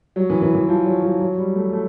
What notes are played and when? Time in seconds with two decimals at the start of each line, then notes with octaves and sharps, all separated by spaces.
0.16 F#3
0.30 E3
0.42 E3
0.55 E3
0.69 F3
0.86 F#3
1.03 F3
1.20 F#3
1.37 G3
1.55 A3
1.72 A3